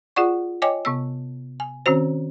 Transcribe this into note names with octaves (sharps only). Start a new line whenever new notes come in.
F4 G#4 D5 F#5 C#6
C#5 D#5 G5 G#5 D6
C3 B3 E6
G#5
D#3 C4 C#4 F#4 C5